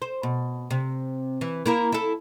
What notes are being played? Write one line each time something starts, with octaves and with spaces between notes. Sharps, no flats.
C5
B2
C3
E3
A#3 E4 A#4
E4 A4